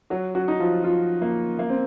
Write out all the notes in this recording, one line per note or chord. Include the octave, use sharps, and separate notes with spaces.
F#3 F#4
F#3 F#4
D#4
F3 F4
F3 F4
A#3
A#3
C4